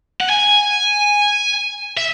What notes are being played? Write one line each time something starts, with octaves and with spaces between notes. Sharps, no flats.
F#5
G#5
E5